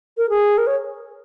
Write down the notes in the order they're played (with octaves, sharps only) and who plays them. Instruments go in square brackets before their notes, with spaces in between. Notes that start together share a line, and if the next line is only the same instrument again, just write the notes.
[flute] A#4
G#4
A#4
C#5